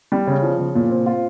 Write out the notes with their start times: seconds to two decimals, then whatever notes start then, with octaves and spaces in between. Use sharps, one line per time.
0.12 G3
0.27 C#3
0.43 F3
0.59 C#3
0.75 A#2
0.91 C4
1.06 F4